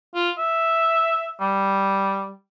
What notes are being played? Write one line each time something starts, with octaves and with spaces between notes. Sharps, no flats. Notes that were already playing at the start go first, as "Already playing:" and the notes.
F4
E5
G3